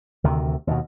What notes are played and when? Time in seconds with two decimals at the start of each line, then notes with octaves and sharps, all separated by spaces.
0.24 D2 C3 D#3
0.67 D#2 B2